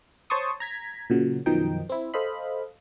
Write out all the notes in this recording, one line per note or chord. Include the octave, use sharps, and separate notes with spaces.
C5 C#5 A5 C6 C#6 D#6
A#5 G#6 B6
A#2 C#3 F#3
F#2 B2 D#3 F3 D#4 G5
C4 E4
A4 C5 D#5 F5 B5